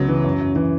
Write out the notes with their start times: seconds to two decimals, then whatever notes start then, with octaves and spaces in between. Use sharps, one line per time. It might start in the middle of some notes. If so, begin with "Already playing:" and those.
Already playing: C#2 C#3 F#3 B3
0.08 E3
0.24 F#2
0.40 F#2
0.56 E3